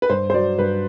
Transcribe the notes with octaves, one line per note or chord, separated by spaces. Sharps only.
B4
G2 C5
C5
F#3 D5
G2 B4